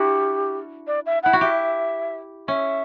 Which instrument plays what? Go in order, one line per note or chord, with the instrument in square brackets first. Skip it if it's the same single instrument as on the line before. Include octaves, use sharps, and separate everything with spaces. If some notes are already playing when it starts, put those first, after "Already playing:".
Already playing: [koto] D4 E4 F#4 [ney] G4
[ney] D5
E5
[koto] E4 [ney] F#5
[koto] F#4
[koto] G4 [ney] E5
[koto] C#4 [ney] E5